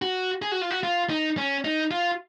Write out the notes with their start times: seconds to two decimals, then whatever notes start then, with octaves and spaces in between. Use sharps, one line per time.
0.02 F#4
0.42 G#4
0.52 F#4
0.61 F4
0.70 F#4
0.83 F4
1.10 D#4
1.38 C#4
1.65 D#4
1.91 F4